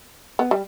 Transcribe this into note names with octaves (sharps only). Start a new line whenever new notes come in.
B3
G3